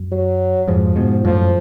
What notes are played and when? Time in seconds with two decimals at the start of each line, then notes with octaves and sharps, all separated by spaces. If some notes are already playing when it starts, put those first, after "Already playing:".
Already playing: F#2
0.11 F#3
0.68 F2 G#2 F3
0.96 G#2 B2
1.24 F#2 A2 F3